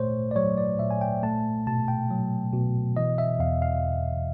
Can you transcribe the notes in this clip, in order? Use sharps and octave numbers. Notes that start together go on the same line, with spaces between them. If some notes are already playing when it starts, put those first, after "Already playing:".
Already playing: A#2 A3 C5 C#5
D5
F#3 C#5
D5
A#2 E5
G#5
G5
A3 A5
B2 A5
G5
F#3
B2
E3 D#5
E5
E2 F5
F5